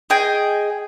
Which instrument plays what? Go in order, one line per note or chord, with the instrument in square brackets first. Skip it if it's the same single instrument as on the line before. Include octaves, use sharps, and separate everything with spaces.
[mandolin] G#4 D#5 G5 G#5